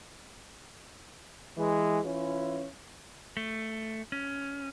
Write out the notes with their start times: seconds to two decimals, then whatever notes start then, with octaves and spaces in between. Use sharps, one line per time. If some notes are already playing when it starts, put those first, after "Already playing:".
1.57 E3 G#3
2.05 E3 C#4 E4 F4
3.37 A3
4.12 C#4